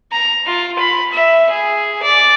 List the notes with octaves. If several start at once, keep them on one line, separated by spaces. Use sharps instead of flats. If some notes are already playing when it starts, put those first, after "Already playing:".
A#5
F4
B5
E5
G#4
D5